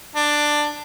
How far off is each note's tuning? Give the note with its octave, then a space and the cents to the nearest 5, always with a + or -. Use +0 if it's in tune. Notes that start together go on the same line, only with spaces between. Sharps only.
D4 +10